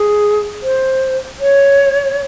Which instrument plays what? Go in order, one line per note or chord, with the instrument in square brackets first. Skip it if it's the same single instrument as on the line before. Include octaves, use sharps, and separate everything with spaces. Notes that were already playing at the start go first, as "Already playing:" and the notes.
Already playing: [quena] G#4
C5
C#5